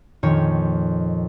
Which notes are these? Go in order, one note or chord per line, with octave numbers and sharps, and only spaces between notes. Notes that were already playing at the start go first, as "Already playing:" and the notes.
F2 A#2 D#3 C#5